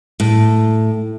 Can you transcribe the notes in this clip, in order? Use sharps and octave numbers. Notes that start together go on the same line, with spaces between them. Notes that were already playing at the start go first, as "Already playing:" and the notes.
A2